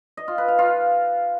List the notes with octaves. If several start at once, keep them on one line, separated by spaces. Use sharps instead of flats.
D#5
F4
B4
F5
F4